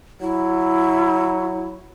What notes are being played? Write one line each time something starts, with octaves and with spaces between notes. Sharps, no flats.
F#3 E4